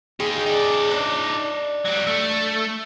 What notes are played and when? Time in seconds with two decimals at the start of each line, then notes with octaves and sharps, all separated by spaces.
0.20 D#4 G4 G#4
0.46 D#4 D5
0.91 D4
1.85 F#3 G3
2.07 A3